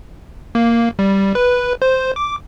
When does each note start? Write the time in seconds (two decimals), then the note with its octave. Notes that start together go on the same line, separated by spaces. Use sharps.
0.55 A#3
0.99 G3
1.35 B4
1.82 C5
2.16 D6